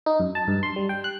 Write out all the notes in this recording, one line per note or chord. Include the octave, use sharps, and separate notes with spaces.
D#4
F#2
A5
G2
C6
G3
G5
F#6